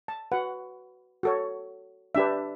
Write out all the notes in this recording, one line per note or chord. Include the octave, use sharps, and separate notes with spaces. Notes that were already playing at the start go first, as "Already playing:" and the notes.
A5
F#4 B4 F#5
F#4 A4 C#5
D4 G4 B4 E5